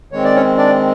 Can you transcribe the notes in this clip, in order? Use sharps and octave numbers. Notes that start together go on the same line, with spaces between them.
D#3 G#3 C4 C#5
D5
C#4 C#5
D4 D5